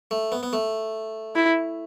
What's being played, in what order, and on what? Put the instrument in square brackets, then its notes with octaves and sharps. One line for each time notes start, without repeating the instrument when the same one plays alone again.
[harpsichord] A3
B3
B3
A3
[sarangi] E4